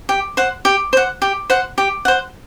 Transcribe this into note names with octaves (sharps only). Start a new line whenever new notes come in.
G4
C5 F#5
G4
C5 F#5
G4
C5 F#5
G4
C5 F#5